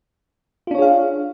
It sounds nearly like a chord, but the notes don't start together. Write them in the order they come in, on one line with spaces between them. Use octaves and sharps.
F4 D4 C#5 G#4 F5